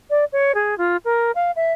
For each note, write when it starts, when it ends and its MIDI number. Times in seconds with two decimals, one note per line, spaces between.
0.10 0.25 74
0.32 0.52 73
0.55 0.77 68
0.78 0.97 65
1.05 1.31 70
1.35 1.51 77
1.56 1.73 76